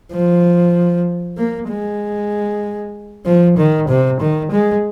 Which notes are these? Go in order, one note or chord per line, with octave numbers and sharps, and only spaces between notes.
F3
A#3
G#3
F3
D#3
C3
D#3
G#3